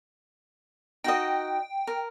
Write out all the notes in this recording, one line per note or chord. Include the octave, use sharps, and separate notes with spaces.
D#4 F#4 D#5 G5
A#4